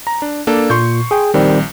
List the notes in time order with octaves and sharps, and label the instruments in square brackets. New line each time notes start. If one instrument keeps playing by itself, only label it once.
[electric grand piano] A#5
D4
A#3 D4 A4
[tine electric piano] A#2 [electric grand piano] C6 C#6 G6
[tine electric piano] G#4 G5
[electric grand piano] A#1 [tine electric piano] D#3 G3 C4